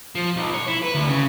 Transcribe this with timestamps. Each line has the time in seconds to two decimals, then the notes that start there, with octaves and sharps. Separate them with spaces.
0.15 F3
0.36 B1
0.54 C#5
0.68 E4
0.82 B4
0.95 D2
1.08 C#3